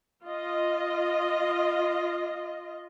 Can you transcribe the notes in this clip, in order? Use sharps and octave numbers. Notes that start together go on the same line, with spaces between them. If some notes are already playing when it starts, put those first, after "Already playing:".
F4 D#5